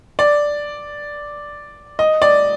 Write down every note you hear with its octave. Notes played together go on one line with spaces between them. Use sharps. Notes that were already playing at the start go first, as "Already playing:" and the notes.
D5
D#5
D5